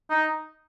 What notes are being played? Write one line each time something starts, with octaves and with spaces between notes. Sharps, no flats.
D#4